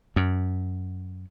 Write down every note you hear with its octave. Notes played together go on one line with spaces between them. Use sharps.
F#2